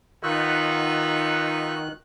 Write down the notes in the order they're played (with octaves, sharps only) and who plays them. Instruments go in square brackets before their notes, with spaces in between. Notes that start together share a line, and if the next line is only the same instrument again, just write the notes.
[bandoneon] D#3 F#6 [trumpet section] B3 D#4 F#5 [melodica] F4 C#6 E6